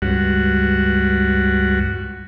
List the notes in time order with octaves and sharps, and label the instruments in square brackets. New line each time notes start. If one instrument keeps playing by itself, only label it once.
[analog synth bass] C#2 [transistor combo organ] G2 F#4